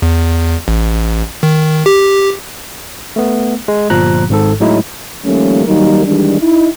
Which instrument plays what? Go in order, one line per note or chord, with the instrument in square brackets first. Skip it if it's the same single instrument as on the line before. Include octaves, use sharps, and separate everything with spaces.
[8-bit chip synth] E2
A1
D#3
G4
[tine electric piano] A3 B3
G#3
G1 A#2 F3 A#5 F#6
G#1 G#2 A4
A2 F#3 G#3 D#4 E4
[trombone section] D#3 F3 G3 A3 A#3 C#4
D#3 F#3 G3 A#3 D#4 A#4
D#3 E3 G3 G#3 D4
D#4 E4